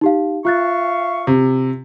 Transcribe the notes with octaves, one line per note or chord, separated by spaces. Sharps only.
D#4 G4 F5
F4 E5 F5 C#6 F#6 A6
C3